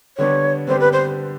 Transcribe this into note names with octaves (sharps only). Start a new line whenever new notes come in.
D3 G3 B3 D4 G4 C#5
D3 G3 B3 D4 G4 C5
B4
C5